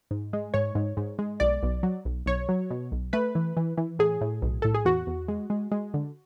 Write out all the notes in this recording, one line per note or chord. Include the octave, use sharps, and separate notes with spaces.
G#2
G#3
G#2 C#5
G#2
G#2
G#3
B1 D5
B1
F#3
B1
B1 C#5
F#3
B2
B1
A3 B4
E3
E3
E3
A2 G#4
A2
B1
A2 A4
G#4
E2 F#4
E2
G#3
G#3
G#3
D3